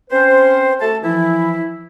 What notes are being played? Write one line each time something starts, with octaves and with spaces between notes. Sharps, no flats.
C4 C#4 B4 C5
A3 F#4 A4 A5
E3 F3 E4